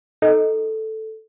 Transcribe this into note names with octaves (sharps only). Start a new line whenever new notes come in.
D#4 A4